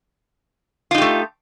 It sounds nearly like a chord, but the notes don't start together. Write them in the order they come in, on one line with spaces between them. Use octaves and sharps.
F4 D#4 G4 A3